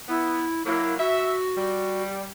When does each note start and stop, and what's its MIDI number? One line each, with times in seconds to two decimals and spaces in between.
0.08 0.43 59
0.08 0.62 64
0.65 0.94 54
0.65 0.94 58
0.65 0.96 64
0.98 2.02 66
0.98 1.36 76
1.56 2.28 55